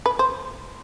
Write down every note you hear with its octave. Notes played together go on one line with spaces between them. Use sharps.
B4
C5